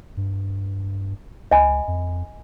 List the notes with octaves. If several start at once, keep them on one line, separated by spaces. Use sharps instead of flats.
G2
C#2 D#5 G#5 B5
F2